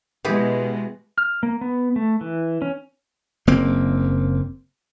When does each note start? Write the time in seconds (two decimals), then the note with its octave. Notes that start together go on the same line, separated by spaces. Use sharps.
0.25 B2 E3 G#3 G4 G#4
1.18 F6
1.43 A#3
1.61 B3
1.96 A3
2.21 E3
2.62 C#4
3.47 F#1 A#3 C4